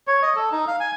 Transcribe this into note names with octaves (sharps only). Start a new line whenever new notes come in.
C#5
D#5
A4
D#4
F5
G#5